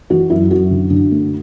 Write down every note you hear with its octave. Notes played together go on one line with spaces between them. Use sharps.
E3 F#4
F#2 E4
F#2 F#4
D3
D3
A3